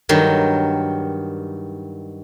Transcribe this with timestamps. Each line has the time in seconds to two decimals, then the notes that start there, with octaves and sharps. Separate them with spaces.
0.09 G2 D#3 F#3